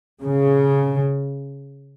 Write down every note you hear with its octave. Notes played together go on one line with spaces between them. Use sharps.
C#3